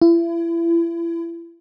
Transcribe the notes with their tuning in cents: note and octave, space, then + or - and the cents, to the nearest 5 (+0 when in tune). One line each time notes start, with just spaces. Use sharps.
E4 +35